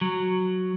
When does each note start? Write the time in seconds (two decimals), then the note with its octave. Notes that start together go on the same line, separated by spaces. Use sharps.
0.01 F#3